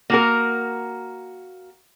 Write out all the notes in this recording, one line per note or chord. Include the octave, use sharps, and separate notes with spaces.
A#3 F#4 A#4